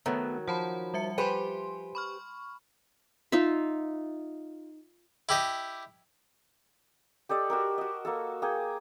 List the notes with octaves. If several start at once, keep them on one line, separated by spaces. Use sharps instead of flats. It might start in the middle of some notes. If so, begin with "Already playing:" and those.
D#3 F#3 A3 B3
F3 F#5 A5 B5
G3 E5 C#7
G4 B4 C5 G#5 C6
B5 C#6 F6
D#4 F4 E5
E4 G4 D#5
G4 A4 D5 D#5
F#4 G4 A#4
F#4 D#5
A#3 F#4 A4
A#3 G#4 G5